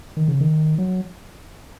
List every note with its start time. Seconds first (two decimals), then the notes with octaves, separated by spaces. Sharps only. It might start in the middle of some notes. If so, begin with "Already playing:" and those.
0.17 D#3
0.28 C#3
0.41 D#3
0.78 F#3